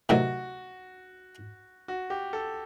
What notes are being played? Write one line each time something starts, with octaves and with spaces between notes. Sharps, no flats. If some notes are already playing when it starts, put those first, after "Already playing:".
D2 C3 D#3 F#3 F#4
F#4
G4
A4